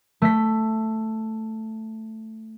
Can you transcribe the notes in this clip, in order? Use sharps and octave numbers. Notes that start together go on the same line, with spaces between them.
A3 B6